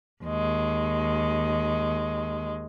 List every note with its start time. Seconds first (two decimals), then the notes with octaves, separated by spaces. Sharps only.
0.23 D#2 G#3